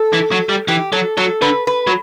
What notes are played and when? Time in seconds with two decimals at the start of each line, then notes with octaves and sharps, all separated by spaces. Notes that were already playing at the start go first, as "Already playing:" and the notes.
Already playing: A4
0.13 E3
0.31 F#3
0.49 G3
0.68 E3 G4
0.92 F#3 A4
1.17 F#3 A4
1.42 D3 B4
1.67 B4
1.87 F#3